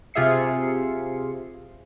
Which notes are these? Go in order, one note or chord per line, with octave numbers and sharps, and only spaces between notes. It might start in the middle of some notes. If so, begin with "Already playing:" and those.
C3 F4 G#4 E5 C7 C#7